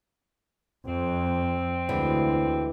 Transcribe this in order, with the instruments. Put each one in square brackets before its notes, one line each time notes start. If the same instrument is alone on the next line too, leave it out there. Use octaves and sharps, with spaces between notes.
[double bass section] F2 [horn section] C4
[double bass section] D2 [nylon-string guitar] D3 E3 G#3